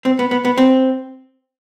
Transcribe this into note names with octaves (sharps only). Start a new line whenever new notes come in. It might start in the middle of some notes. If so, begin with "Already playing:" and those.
C4
B3
B3
B3
C4